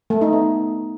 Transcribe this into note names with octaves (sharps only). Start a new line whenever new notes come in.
A3
D#4
B3